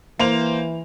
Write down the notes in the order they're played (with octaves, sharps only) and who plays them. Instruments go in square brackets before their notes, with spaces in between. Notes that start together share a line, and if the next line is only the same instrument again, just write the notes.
[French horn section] E3 [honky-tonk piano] A#3 C5 F7